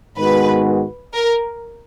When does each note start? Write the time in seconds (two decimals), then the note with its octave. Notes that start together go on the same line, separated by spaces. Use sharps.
0.17 G#2 D#3 G#3 B3 F#4 B4
1.13 A#4